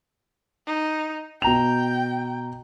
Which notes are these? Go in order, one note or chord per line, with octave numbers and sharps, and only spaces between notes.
D#4
B2 G5 A#5 F7